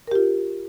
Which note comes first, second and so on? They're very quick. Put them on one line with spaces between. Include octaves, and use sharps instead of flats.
A#4 G4 F4